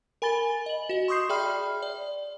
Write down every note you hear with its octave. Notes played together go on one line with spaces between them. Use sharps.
A#4 G#5 B5 A6 G7
D#5 F#7
F#4 D#5
C6 C#6 D#6 G6 C7
G#4 D5 E5 G5 B5 F6
D5